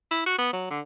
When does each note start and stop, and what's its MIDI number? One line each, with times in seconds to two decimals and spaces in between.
0.11 0.22 64
0.26 0.35 66
0.39 0.51 59
0.53 0.67 54
0.70 0.80 50